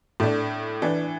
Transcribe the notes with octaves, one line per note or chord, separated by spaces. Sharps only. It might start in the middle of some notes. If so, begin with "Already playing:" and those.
A2 A3 D4
E3 D4